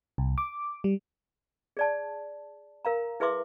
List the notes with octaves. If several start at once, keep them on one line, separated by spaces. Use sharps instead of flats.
C2
D6
G3
G#4 D5 A5
A#4 F5 A#5
E4 G#4 B4 E5 C6 D6